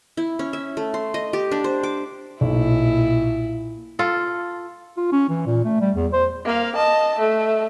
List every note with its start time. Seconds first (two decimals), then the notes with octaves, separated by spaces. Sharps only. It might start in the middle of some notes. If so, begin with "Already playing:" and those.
0.17 E4
0.39 C#4
0.53 E5
0.77 A3
0.94 C6
1.14 D#5
1.33 G4
1.52 D4
1.64 C5
1.83 D6
2.41 B1 A#2 E4
3.99 F4 A4
4.97 F4
5.12 C#4
5.29 E3
5.46 A#2
5.65 A3
5.81 G3
5.96 E2
6.13 C5
6.45 A#3 F5
6.75 D#5 A5
7.18 A3